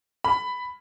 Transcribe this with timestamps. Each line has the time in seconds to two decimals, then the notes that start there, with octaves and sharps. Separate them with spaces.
0.24 B5